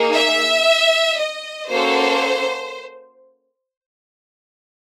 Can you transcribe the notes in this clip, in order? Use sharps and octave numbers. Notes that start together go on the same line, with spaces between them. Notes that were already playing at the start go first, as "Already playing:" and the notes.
Already playing: A#3 D#4 G#4
E5
D#5
A#3 C#4 F#4 A4 C5